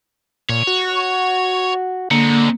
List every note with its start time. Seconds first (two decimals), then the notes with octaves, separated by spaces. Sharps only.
0.49 A#2 C#5
0.67 F#4
2.11 D3 G#3 A#3 C4